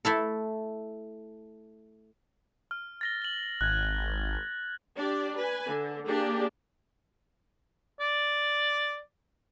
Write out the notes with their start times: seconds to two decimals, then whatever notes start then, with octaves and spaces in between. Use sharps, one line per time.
0.05 A3 E4 A4
2.71 F6
3.01 A6 A#6 G7
3.22 F#7 G7
3.61 G#1 F#6 G#6
4.96 D4 G4 D5
5.37 B4 G#5
5.67 D3
6.07 A#3 D4 G4 G#4
8.00 D5